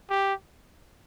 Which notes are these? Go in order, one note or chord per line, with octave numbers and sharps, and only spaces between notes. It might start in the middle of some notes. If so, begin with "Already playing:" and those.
G4